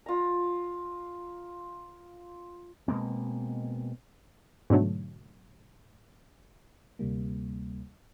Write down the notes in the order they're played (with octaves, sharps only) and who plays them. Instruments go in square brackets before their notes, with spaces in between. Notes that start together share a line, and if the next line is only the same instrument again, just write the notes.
[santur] F4 A#5
[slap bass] B2 G#3 A#3 C4
[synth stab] G#2 B2 D3 F#3 A3
[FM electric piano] D2 C3 G3 A#3